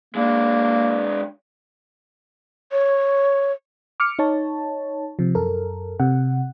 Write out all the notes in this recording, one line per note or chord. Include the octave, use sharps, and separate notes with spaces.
G#3 A#3 D4
C#5
D6 F6 C#7
D#4 C#5 A5
C3 F3
F#2 A4 A#4
C3 F#5